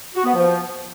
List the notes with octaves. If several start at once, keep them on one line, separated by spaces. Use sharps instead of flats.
F#4
B3
F3